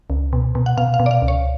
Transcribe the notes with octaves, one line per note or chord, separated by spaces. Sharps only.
C#2
B2
B2
F#5
B2 F5
F5
B2
D5
F5
C#2
C#5